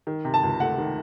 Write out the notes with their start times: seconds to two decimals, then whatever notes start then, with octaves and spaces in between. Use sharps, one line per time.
0.07 D#3
0.25 C3
0.34 A5
0.43 C#2
0.60 A3 F#5
0.78 D#3